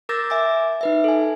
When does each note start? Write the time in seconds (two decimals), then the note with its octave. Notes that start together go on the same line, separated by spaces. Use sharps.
0.09 A#4 D6 E6 G6 A6 A#6
0.30 E5 G#5 D6
0.81 D#4 B4 E5
1.04 A4 G#5